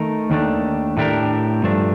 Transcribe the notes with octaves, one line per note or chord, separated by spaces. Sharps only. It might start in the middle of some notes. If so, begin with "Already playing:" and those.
Already playing: D#3 A3 D#4 A#4
D#2 D#3 A3 D4
A2 A3 D4 G4 A#4
G2 F3 A3 D4